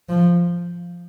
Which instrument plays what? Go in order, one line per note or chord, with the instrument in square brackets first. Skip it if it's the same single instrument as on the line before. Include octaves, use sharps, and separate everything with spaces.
[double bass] F3